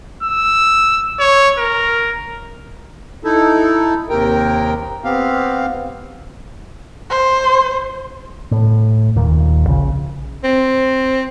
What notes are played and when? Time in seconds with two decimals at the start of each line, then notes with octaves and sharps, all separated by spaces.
0.23 E6
1.20 C#5
1.58 A#4
3.24 D#4 E4 A4
4.10 D#2 C3 A#4 G5
5.04 B3 C4 G4 F5
7.10 C5
8.51 A2
9.16 D#1 A#2 D#3
9.67 A#1 C#3
10.44 C4